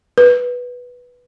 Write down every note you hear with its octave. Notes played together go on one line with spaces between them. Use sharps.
B4